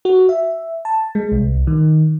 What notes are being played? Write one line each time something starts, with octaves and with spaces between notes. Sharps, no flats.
F#4
E5
A5
G#3
C2
D#3